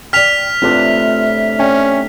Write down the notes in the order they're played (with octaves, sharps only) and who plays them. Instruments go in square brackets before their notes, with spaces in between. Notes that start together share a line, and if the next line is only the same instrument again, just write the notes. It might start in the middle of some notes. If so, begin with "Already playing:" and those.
[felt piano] D5 G5 [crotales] F6 B6 F7
[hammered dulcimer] A2 C3 D4 [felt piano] C4 F4 B4
[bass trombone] C#4 [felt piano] D5 G5